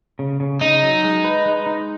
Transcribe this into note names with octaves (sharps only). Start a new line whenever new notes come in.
C#3
C#3
C#3 D#4
F#3
G#3
B4
G#3
D#4